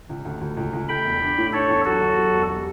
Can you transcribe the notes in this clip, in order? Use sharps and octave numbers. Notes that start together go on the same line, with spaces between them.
C#2
D2
D2
C#2
C#2
A3 G5 B5
E1
D4
A2
D4 A4 C#5
E2
F#3 F#4 A4
G1
F#3
E1
G3